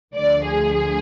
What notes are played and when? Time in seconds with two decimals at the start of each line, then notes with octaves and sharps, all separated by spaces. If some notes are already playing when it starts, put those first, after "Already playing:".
0.14 D2 D3 F3 D5
0.45 G#4